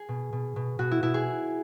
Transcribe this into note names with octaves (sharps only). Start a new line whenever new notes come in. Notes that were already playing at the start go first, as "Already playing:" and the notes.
Already playing: G#4
B2
B2
B2
B2 F#4
E4
B2 E4
G#4